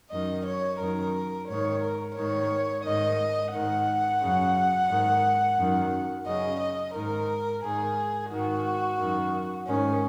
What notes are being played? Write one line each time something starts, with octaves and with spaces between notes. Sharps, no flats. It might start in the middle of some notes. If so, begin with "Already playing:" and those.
F#2 D#3 D#5
C#5
F#2 D#3 A#4
G#2 D#3 C#5
A#4
G#2 D#3 C#5
G#2 D#3 D#5
G#2 D#3 F#5
F#2 C#3
G#2 D#3
F#2 D#3
F#2 C#3 D#5
D#5
G#2 D#3 A#4
G#2 D#3 G#4
G#2 D#3 F#4
F#2 D#3
G#2 D#3 C#4